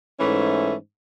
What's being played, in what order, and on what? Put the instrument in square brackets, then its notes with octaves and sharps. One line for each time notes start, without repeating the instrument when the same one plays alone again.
[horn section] G#2 E3 A3 C#4